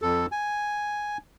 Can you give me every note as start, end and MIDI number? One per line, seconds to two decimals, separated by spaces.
0.02 0.26 41
0.02 0.26 69
0.32 1.18 80